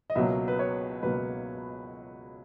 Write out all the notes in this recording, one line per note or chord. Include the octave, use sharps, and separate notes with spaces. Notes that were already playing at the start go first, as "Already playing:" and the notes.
D#5
C#2 B2 F#3 A#3 E5
B4
C#5
C#2 B2 F#3 A#3 B4